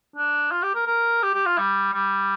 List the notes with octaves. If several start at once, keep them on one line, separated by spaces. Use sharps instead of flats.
D4
F4
G4
A#4
A#4
G4
G4
F4
G3
G3